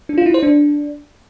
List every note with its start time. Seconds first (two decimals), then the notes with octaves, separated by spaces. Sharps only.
0.09 D4
0.18 F4
0.26 E4
0.34 C5
0.43 D4